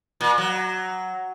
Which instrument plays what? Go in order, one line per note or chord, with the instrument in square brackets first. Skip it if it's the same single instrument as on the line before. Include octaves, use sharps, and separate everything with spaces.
[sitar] A#2
F#3